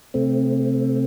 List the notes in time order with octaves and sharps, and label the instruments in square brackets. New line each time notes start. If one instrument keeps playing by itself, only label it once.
[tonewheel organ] C3 A3 C4